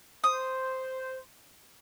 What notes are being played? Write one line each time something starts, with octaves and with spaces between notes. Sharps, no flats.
C5 D#6